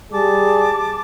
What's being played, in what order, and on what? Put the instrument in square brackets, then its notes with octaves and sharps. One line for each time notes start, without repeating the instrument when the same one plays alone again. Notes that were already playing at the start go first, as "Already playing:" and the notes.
[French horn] G3 [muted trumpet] G#4 [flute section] A5 D6